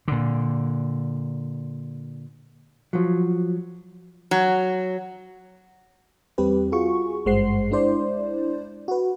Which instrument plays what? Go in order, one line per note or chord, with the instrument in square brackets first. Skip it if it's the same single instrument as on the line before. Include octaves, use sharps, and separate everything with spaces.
[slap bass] A#2 D3
[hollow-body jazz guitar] F3 F#3
[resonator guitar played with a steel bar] F#3
[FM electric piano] E2 G3 C4 G4 B4
F4 F#4 G#4 C#6
G#1 G2 G#3 C5 F#5 C7
G#3 D4 E4 C5 D5
F#4 B4